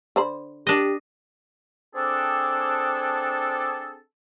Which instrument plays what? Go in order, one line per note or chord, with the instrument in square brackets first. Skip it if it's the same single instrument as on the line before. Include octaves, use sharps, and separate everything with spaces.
[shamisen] D3 C5 B5
[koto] D4 D#5 [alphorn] G4
[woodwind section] C4 D4 G#4 A4